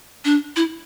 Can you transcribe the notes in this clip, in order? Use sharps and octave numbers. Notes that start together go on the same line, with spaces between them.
D4
E4